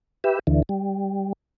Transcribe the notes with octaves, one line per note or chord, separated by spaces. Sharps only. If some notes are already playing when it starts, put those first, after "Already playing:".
G4 B4 E5
D2 D3 E3
G3